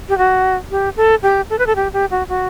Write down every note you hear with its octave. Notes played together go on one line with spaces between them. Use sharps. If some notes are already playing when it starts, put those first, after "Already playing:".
G4
F#4
G4
A4
G4
A4
B4
A4
G4
G4
F#4
F#4